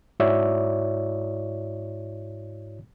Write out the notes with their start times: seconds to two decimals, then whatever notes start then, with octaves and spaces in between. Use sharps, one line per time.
0.20 G#2 E4 F#4 C#5 D5 E5